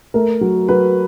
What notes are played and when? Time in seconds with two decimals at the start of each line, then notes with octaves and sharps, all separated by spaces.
0.14 A3 A#4
0.41 F#3
0.68 F#3 B4